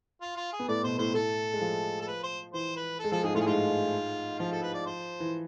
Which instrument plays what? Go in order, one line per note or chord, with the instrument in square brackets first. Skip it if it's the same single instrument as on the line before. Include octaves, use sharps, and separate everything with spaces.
[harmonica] F4
F4
G#4
[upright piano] B3
[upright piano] A2 A3 [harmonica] D5
[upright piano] B2 B3 [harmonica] C5
[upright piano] A2 A3 [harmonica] C5
[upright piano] A2 A3 [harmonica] A4
[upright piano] G#3
F3
[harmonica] A4
B4
C5
[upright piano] E3 [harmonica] C5
[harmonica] B4
A4
[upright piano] G#3
[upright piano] F3 [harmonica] A4
[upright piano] G#2 G#3 [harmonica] G#4
[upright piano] A2 A3 [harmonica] F4
[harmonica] G#4
[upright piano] G#2 G#3 [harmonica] F4
[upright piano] F3 [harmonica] F4
[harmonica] A4
B4
D5
C5
[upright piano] E3